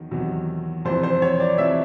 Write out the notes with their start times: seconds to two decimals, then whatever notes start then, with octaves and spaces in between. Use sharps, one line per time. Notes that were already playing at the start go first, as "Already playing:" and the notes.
Already playing: E2 D#3 F#3
0.11 E2 C3 D#3 F#3
0.85 F2 C3 E3 C5
1.03 C5
1.22 C#5
1.40 D5
1.58 F2 C3 E3 E5